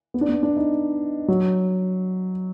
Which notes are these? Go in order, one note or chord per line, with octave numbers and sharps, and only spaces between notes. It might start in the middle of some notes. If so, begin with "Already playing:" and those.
B3
D4
B3
D4
D#4
F#3